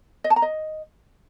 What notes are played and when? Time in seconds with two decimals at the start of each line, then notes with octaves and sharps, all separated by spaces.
0.24 D#5
0.30 A5
0.36 A#5
0.42 D#5